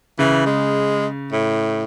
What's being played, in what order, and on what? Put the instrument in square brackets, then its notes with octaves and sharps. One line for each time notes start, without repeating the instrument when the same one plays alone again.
[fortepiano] C#3 [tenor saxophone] E3
[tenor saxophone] G#3
A2